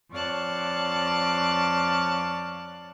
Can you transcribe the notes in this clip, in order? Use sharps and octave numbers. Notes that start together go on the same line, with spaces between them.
F2 C#5 D5 F5 A5 F#6